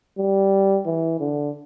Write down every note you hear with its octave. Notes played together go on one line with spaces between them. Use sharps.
G3
E3
D3